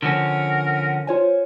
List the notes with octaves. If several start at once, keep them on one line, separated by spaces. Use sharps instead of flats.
D3 F3 C#4 A#4 F#5
F4 C5 C#5 G#5